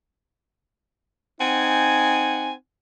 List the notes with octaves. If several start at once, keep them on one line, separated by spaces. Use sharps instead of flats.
C4 D#4 F#5 G#5